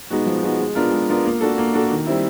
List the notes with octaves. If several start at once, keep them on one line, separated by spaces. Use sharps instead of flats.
G#3 B3 D#4 F#4
F3
G#3 B3 D#4 F#4
G#3
B3 D4 F4 A#4
G#3
B3 D4 F4 A#4
A#3
D4 F#4 A4
A#3
D4 F#4 A4
D#3
G3 C4 E4